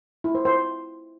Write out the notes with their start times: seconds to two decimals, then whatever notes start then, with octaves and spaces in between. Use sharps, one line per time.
0.24 E4
0.35 C5
0.45 C5